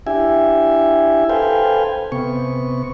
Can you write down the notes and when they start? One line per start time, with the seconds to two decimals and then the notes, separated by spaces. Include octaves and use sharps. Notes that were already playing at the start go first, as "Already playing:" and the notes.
0.07 D4 E4 G4 E5 G#5
1.29 A4 B4 C5 F5 G5 G#5
2.12 C3 B3 C#6